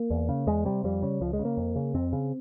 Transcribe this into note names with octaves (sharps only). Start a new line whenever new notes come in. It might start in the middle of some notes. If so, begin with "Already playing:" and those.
Already playing: A#3
E2
C#3
E2 G#3
C3 G3
F2 G3
C#3
C#2 F3
G#3
C#3
A#3
F2
C#3
F2 C4
C#3